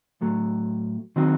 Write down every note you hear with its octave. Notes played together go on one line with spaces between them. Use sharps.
A2 F#3 A3
D#3 F#3 C4 F#4